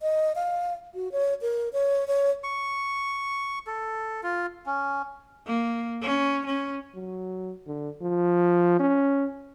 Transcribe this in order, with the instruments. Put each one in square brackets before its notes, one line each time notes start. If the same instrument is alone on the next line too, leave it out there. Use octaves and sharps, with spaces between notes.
[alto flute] D#5
F5
F#4
C#5
A#4
C#5
C#5
[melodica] C#6
A4
F4
C#4
[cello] A#3
C#4
C#4
[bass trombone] F#3
D3
F3
C#4